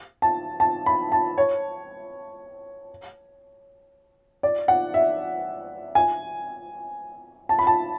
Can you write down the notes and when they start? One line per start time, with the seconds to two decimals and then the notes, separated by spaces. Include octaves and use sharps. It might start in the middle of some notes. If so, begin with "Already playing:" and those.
0.22 A5
0.60 A5
0.86 B5
1.12 A5
1.38 C#5
4.43 D5
4.68 F#5
4.94 E5
5.95 G#5
7.49 A5
7.59 B5
7.67 A5